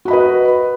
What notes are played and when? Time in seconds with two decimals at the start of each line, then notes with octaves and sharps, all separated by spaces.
0.05 F#4
0.08 B5
0.11 D#5
0.13 B4